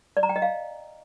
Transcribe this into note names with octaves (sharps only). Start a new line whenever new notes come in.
D5
A#5
G5
D#5
F5